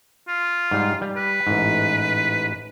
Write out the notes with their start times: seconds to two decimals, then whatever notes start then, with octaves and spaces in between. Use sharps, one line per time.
0.28 F4
0.71 G#2 G3
1.01 G3
1.16 B4
1.47 A1 G#2